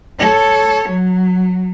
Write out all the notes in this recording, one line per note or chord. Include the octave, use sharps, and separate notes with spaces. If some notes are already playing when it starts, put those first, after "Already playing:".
A4 C#5
F#3